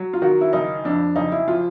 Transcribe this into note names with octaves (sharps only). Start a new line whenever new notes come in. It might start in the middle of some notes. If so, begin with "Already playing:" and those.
Already playing: F#3
F4
D#3 F#4
E4
F#1 D#4
F2 D4
F#1 D#4
E4
F3 F4